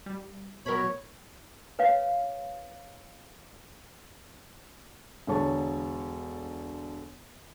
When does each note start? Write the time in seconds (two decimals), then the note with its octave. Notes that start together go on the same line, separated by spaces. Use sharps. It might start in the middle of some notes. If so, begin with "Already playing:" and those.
0.06 G3
0.66 B2 F#3 A#4 C#5 B5
1.79 B4 C#5 F5
5.27 E1 D3 C#5 A5